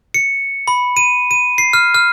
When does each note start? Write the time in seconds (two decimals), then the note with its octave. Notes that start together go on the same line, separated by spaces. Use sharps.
0.14 C#7
0.68 B5
0.97 D#7
1.31 D#7
1.58 C7
1.73 F6
1.94 F6